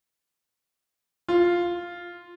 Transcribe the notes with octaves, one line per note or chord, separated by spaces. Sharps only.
F4